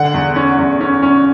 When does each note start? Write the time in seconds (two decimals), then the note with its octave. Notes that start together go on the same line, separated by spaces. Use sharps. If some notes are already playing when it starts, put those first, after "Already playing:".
Already playing: D3 F#5
0.14 E2
0.36 C#4
0.58 E2
0.81 C#4
1.03 C#4